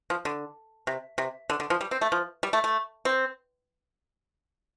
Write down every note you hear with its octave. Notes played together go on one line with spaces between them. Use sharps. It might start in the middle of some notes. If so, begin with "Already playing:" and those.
F3
D3
C3
C3
D3
D3
F3
G3
C4
A3
F3
G3
A3
A3
C4